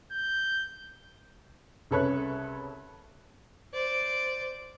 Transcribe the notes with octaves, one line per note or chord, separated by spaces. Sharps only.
G6
C2 C#3 A4 B4 C#5 F#6
C5 D5